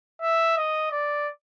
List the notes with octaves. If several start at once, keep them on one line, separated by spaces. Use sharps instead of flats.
E5
D#5
D5